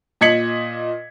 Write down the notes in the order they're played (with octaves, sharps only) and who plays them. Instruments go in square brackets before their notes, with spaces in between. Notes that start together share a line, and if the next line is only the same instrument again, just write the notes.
[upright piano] A#2 D#5 G#6 B6 C#7 F#7